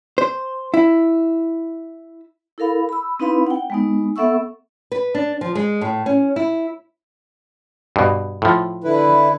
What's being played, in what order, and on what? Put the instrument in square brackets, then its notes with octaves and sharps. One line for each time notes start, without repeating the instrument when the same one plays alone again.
[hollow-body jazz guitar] C5
E4
[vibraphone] E4 A4 A#4 F5 B5
B5 E6
C4 D#4 E4 B4 F5 B5
F#5 G5
G#3 B3 D#4
B3 A4 E5 F#5 C#6 E6
[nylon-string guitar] B4
D4
F3
G#3
A2
C#4
E4
[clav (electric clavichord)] G2 B2
A2 F3
[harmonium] D3 E4 B4